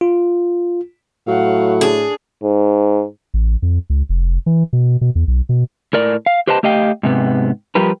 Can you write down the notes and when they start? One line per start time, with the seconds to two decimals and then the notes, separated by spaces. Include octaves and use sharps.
0.01 F4
1.28 A2 F#3 F5 F#5
1.81 D4 G#4
2.43 G#2
3.34 A1
3.62 F2
3.90 C#2
4.09 F1
4.46 E3
4.73 B2
5.01 B2
5.15 E2
5.28 B1
5.49 B2
5.93 A2 A#4 D5
6.26 F5
6.47 G4 B4 C5 D#5 G#5 A5
6.63 A3 G4 D#5 F5 G5
7.03 G#2 C3 B3
7.75 F3 G3 G4 A#4 B4